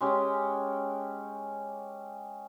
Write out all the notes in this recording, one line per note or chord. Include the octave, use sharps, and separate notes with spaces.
G#3 C#4 G4